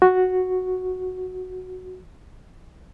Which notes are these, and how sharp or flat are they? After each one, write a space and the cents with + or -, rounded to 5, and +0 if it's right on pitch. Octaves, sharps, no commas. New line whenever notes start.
F#4 -5